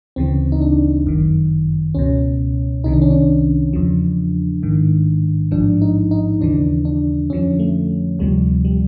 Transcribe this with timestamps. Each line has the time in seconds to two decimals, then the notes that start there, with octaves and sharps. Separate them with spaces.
0.16 D2 C#3 E3 C4
0.52 D#4
0.61 D4
1.06 G1 F#2 D#3
1.95 C#2 B2 C#4
2.84 C2 C3 D#3 D#4
2.93 D4
3.02 C#4
3.10 D4
3.73 E2 C#3 F3
4.63 A1 G#2 D#3
5.51 A1 G#2 F3 D4
5.82 D#4
6.11 D#4
6.41 D#2 C#3 E3 D4
6.85 D4
7.30 F2 D3 F3 C#4
7.59 A3
8.19 D2 C3 F3 G3
8.65 G3